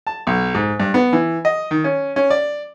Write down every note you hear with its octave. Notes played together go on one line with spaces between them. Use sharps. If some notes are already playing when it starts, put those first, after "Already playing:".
A5
B1
G#2
G2
B3
E3
D#5
D#3
C#4
C#4
D5